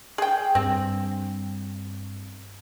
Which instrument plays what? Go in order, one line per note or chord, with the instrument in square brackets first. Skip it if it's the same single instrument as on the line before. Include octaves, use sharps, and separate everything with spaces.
[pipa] G#4 G5
[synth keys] G2 [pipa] C4